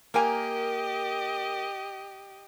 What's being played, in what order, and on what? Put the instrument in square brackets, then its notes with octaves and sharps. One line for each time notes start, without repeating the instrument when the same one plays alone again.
[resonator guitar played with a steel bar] A#3 A#4 G#5 [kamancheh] G4 D#5